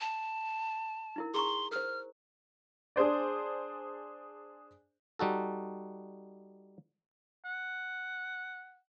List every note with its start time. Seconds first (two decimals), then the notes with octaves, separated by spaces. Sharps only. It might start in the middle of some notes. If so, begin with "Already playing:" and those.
0.01 A5
1.16 D#4 E4 A#4
1.34 G#4 A#5 C6 C#6
1.71 A#4 C5 F6
2.96 D4 G#4 C5 D5
5.19 G3 D#4 F#4 A4
7.45 F#5